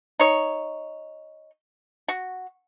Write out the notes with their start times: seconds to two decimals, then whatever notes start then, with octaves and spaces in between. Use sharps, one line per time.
0.20 D#4 C#5
2.08 F#4